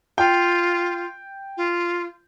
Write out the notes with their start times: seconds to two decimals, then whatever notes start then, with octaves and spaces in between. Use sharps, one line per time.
0.18 F4 G5
1.57 F4